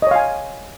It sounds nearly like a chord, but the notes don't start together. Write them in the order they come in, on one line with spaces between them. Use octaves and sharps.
D#5 C#5 F5 G#5